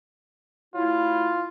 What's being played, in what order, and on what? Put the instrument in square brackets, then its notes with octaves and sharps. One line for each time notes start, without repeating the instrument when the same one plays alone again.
[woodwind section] F#3 A3 E4 [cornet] F4